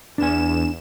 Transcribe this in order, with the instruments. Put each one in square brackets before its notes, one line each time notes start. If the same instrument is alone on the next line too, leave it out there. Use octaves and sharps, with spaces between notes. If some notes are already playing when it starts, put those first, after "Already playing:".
[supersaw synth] E2 E7 [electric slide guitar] D4 G#5